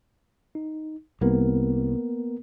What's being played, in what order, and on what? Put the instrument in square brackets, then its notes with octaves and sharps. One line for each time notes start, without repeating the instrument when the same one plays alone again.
[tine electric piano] D#4
[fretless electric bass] C2 [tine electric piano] A#3 B3 A#4